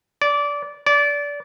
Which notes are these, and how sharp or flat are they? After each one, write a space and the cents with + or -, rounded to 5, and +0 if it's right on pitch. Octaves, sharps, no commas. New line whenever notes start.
D5 -20
D5 -25